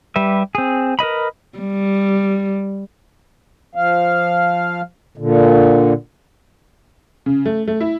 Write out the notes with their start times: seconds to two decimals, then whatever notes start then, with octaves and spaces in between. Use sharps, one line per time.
0.16 G3 G4 B4 E5
0.55 C4 G#4
0.99 A#4 B4 D#5 B5
1.58 G3
3.75 F3 F5
5.18 A#2 D3
7.26 C#3
7.45 A3
7.67 A3
7.81 E4